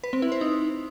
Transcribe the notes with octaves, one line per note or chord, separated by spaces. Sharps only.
B4
C4
E4
C5
D#4